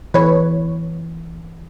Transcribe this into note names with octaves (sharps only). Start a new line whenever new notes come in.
E3 B4 C#5